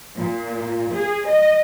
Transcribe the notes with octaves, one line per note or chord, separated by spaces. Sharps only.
A#2
G#4
D#5